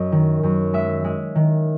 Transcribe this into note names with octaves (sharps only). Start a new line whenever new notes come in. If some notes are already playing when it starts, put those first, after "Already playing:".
Already playing: F#2 D#5
D#3
F#2
G#3 E5
G#3
D#3